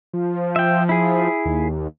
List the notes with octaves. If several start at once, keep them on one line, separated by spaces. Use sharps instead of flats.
F3
E5 G5
E4 G#4
D#2